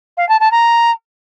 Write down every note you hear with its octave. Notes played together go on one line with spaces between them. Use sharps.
F5
A5
A5
A#5